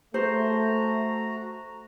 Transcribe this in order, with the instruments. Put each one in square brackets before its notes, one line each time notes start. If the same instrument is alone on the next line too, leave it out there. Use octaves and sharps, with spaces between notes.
[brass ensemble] A3 [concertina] F#4 A#5 [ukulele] C5